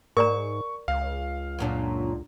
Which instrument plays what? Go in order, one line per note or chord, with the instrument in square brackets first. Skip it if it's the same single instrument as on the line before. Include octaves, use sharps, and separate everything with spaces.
[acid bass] G#2 [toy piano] A#4 D5 A#5 [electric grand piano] C#6
[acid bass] C#2 [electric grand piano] F5
[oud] F#2 A#2 D4